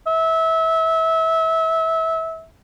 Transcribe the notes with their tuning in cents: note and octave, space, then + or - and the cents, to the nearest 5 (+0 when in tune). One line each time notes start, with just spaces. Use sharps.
E5 -25